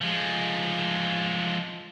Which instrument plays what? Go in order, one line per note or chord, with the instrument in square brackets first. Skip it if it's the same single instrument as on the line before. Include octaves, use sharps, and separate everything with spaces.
[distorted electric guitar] F3 G#3